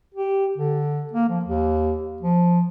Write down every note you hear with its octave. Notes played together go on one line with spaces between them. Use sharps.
G4
D3
A#3
F3
D#2
F3